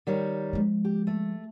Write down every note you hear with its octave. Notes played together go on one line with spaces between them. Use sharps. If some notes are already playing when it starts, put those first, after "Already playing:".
D#3 G3 C#5
F3 G#3
G4
A3